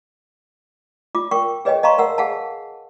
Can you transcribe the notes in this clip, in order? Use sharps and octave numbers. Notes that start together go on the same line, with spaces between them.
F4 D6
A#4 G5 C#6
G#4 B4 C#5 D#5 G5 G#5
D#5 F5 A5 A#5 C6 C#6
A#4 F#5 E6
G#4 F5 F#5 G#5 A5